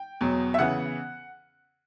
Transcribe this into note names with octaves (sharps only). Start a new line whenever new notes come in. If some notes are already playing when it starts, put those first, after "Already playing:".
Already playing: G5
E2 B2 F#3
E5
C#3 E3 B3 F#5